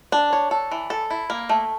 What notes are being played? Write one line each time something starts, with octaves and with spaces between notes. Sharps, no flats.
D4
C#5
A4
E3
A4
E4
A#3
A3